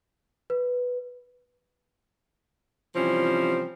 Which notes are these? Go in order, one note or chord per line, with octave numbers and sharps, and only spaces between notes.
B4
C3 E3 F3 G3 C4 C#4